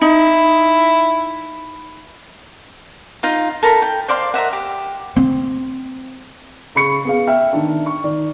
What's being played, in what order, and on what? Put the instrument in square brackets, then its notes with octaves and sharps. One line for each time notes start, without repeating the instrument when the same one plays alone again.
[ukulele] D#4 [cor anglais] E4
[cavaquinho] D#4 F4 F5
A4 A#4 A#5 B5
G5
C5 D5 F5 C6
A#4 D#5 E5 F#5
G4
[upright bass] C4
[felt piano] C#3 B5 C#6 C#7
B3 G#4 F5
E5 G5 F6
D#3 D4
C#6
D#3 D5